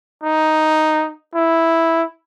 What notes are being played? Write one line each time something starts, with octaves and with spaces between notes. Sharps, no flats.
D#4
E4